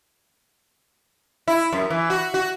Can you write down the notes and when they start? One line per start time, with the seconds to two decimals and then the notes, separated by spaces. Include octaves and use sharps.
1.48 E4
1.73 F#2
1.90 E3
2.10 F#4
2.34 F#4